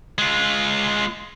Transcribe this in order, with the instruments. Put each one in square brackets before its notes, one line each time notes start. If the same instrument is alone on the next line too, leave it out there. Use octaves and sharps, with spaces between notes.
[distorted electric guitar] G#3 F4